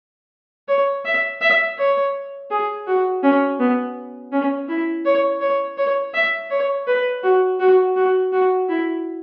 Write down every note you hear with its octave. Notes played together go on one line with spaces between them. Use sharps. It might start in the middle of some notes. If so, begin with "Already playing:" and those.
C#5
E5
E5
C#5
G#4
F#4
C#4
B3
C#4
E4
C#5
C#5
C#5
E5
C#5
B4
F#4
F#4
F#4
F#4
E4